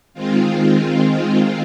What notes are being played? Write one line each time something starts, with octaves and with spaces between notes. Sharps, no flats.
D#3 G#3 C4 F4